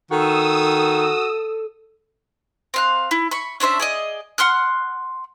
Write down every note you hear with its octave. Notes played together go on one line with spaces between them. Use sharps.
D#3 F#4 A4 D#6 E6
C4 F5 F#6
E4
B5 C#6
C#4 D4 C5 E5
G#4 D5 D#5
F#5 C6 F6 F#6